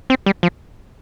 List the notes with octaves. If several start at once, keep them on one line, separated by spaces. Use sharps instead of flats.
C4
G3
F3